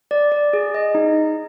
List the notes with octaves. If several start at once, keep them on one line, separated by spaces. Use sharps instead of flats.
D5
D5
G#4
D#5
D#4